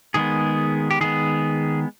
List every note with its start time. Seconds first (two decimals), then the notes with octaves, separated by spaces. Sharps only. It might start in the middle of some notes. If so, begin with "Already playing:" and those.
0.14 D#3 G#3 B3 G#4
0.91 G4
1.01 D#3 G#3 B3 G#4